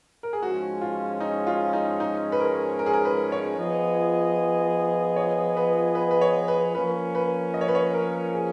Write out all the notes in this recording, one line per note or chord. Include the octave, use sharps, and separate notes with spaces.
A#4
G#4
G#2 F3 G#3 C#4 F#4
F4
D#4
F4
D#4
D#4
B4
A#4
A#4
G#4
A#4
B4
C#5
F3 B3 F4 G#4 D#5
C#5
B4
B4
B4
C#5
B4
F3 A#3 C#4 B4
B4
D#5
C#5
B4
C#5
A#4
G#4